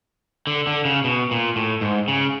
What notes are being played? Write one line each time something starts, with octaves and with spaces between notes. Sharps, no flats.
D3
D3
C#3
B2
A#2
A2
G#2
C#3